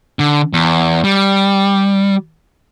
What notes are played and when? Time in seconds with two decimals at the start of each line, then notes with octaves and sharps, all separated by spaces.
0.19 D3
0.53 E2
1.04 G3